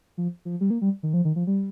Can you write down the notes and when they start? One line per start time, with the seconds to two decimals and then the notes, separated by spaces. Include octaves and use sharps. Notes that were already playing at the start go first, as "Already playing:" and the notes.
0.18 F3
0.45 F3
0.61 G3
0.70 A#3
0.82 G3
1.03 D#3
1.14 F3
1.25 D#3
1.36 F3
1.47 G3